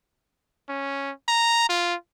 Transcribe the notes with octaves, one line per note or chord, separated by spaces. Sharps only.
C#4
A#5
F4